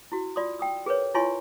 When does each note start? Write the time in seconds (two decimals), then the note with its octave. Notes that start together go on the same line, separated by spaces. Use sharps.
0.12 E4 F#4
0.36 F4 D5 C6 D#6
0.59 G5 D#6 E6
0.86 G#4 A#4 B4 C#5
1.14 E4 F4 C#5 G#5 C6 C#6